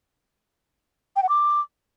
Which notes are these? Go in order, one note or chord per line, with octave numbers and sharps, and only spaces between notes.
G5
F#5
D6